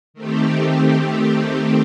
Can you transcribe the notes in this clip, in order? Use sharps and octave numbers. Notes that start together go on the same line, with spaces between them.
D#3 A3 C4 G4